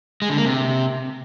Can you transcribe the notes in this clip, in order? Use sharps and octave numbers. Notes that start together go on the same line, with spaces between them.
G#3
D3
A#3
C3